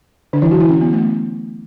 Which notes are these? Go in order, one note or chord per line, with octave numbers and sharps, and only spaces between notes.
D3 D4
E3 E4
F#3 F#4
E3 E4
C#4
B3
A3